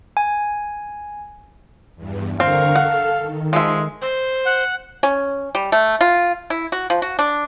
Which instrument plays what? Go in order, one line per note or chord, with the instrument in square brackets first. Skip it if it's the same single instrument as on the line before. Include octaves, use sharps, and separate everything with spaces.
[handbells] G#5
[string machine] E2 G2
[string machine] D3 A#4 C#6 [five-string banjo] C4 [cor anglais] F5
[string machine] A4 [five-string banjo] F#5
[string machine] D#3
[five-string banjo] F3 E5 [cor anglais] G#3
[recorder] C5
[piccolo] F#5
[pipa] C#4
G3
A3
F4
E4
F#4
F3
F#4
D4